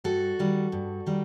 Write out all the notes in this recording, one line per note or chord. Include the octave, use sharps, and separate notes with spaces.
G2 F#4 A4
D#3 G3
G2
D#3 G3